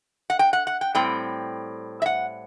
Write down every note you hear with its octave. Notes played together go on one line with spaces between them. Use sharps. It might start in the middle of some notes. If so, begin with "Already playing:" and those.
F#5
G5
F#5
F#5
G5
A2 G3 C4 G5
E5
F#5